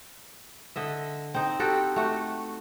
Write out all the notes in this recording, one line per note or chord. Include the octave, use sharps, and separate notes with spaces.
D3 D#5 E5
C4 D#4
F#4 G4 A4
A3 F#4